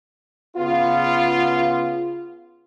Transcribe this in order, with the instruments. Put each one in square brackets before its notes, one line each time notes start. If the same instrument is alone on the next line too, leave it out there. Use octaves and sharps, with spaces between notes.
[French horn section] C#3 B3 F4